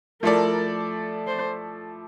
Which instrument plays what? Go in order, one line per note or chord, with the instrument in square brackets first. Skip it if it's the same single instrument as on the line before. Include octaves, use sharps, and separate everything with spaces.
[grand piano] F3 A3 E4 A4 D5 [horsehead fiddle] A#4
[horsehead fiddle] C5